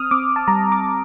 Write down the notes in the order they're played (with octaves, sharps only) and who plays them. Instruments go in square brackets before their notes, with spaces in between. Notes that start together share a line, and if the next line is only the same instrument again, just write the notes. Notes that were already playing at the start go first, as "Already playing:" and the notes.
Already playing: [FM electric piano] C4 D#6 F6
C4 D6
A5
G3 A#5
D6